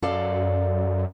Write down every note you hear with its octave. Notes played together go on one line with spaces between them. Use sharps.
F#2 A4 D5 F5